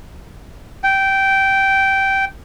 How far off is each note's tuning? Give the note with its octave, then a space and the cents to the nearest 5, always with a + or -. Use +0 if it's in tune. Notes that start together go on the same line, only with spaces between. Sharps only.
G5 -10